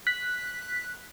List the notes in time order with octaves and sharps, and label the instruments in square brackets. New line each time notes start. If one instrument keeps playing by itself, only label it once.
[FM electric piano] F#6 B6